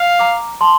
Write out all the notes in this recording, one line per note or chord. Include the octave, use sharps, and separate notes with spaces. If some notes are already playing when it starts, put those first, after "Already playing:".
Already playing: F5
A#5 D6
A5 C6